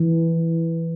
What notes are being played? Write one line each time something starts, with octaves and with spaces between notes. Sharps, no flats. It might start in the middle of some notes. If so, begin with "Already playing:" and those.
Already playing: E3